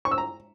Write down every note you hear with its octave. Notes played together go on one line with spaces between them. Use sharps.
C#6
E6
A#5